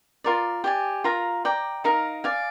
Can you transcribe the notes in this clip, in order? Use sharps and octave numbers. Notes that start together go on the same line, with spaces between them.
F4 A#4 D5
G4 D5 G#5
F4 A#4 F5 A#5
D5 G5 A#5
D#4 A#4 F5 A#5
D5 F5 G#5